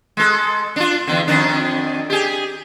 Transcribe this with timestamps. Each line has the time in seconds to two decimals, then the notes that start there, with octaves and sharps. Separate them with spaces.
0.17 G#3 A4
0.76 D4 F4
1.07 E2 D3
1.28 F2 D#3 D4
2.10 G4 G#4